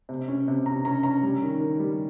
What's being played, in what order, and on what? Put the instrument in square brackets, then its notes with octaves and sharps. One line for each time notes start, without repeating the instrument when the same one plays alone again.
[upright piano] C3
C#4
C3
C3 A#5
C#4 A#5
C#4 A#5
G3
D#3
D#3
G3